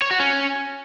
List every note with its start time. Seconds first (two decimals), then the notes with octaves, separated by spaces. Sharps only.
0.02 C#5
0.11 F#4
0.20 C#4